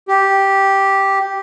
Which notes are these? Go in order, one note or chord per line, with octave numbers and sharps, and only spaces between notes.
G4